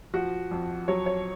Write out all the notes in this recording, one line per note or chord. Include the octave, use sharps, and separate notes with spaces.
F3 F#4
F2
F#3 C#5
C#5